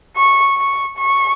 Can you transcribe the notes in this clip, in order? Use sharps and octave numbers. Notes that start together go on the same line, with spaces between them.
C#6
C#6
C#6